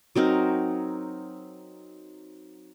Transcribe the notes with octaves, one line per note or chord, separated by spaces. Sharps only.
F#3 C4 D#4 A#4